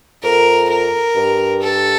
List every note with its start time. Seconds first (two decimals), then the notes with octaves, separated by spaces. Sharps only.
0.23 F2 A#4
0.70 A#4
1.16 G2
1.62 A4